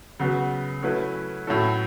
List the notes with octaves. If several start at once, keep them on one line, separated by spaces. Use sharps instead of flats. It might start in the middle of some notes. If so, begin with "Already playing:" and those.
C#3 F#3 B3 F#4 B4
F#3 A3 C#4 E4 B4
A2 F#3 C#4 E4 A4